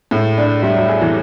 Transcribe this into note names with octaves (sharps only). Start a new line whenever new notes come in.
A2 G#3
D4
G3 A3
F#3
G#4
E3